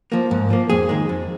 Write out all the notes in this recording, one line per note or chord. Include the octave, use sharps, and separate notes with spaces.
F3 A#3
G#2
F3 A#3
F2 G#4
D#3 G#3
F2